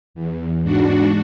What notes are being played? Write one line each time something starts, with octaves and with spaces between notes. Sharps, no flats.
E2
G#2 D4 F#4